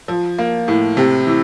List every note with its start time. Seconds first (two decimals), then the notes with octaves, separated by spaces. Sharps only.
0.08 F3
0.38 A#3
0.68 A2
0.97 C3
1.27 E3